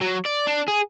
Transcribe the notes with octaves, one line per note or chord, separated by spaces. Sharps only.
F#3
D5
D4
G#4